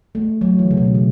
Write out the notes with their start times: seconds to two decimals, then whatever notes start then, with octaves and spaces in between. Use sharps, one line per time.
0.15 A3
0.41 F#3
0.59 E3
0.71 C#3
0.77 B2
0.95 C#3